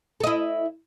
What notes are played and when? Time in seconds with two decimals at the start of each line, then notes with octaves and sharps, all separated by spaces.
0.20 A4
0.24 D#5
0.27 E4